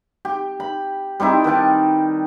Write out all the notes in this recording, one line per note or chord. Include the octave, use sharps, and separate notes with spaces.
G4
B5
G3 C4 D#4 E4
D#3 B4 G5 A5